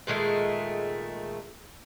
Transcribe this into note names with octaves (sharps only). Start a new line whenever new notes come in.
A#2 D#3 G#3 A3